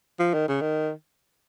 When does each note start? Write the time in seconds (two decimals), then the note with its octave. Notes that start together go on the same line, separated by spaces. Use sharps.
0.19 F3
0.33 D#3
0.48 C#3
0.61 D#3